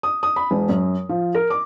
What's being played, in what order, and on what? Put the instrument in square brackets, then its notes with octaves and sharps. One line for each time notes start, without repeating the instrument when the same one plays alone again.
[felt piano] D#6
D#6
B5
E1
F#2
F3
A#4
D6